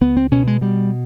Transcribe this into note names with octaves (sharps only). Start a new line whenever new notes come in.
C#2 B3
C4
B2 C#4
G#3
B2 G3